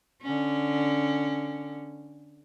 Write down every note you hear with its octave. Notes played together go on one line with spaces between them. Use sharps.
D3 C#4